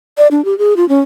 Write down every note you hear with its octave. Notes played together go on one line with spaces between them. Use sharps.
D5
D4
G4
G#4
F4
C#4